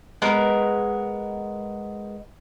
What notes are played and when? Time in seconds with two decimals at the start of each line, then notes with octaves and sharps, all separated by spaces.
0.22 G#3 B3 A#4